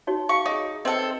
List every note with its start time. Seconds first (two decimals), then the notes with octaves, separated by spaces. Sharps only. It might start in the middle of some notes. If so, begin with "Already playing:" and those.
0.07 D#4 F#4 C#5
0.29 F5 C#6
0.46 D#4 G#4 C#5
0.85 C4 A4 B4 D#5